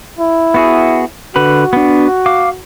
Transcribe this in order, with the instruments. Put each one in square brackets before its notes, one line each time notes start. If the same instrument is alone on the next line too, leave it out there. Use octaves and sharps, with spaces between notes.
[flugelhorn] E4
[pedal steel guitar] B3 F#4 G#4
[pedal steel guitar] D3 B4 B5 [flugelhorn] F#4
[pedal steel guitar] B3 D4
F5 D6